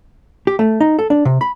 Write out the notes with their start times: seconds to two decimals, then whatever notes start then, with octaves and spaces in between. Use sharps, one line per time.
0.47 G4
0.59 A3
0.80 D#4
0.99 A4
1.10 D4
1.25 C3
1.41 B5